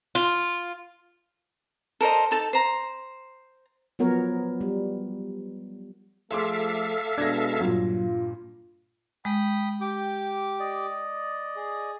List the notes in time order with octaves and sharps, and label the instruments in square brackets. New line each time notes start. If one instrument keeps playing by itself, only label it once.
[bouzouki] F4
[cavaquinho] A4 A#4 C5 D#5
D#4 A4 A5
C5 A#5
[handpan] F3 F#3 B3 A#4 C#5
G3
[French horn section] F3 A3 [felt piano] G#4 C6 D6 [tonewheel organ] A4 E5 F5
[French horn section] B2 G#3 [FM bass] D4 [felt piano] G#6 A#6
[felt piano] G2 A#2 [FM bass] F#3 [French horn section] F4
[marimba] G#3 [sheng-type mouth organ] G5 B5 D#6
[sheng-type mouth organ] G4 D6 [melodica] G5
[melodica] D5 D#5
[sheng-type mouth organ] G#4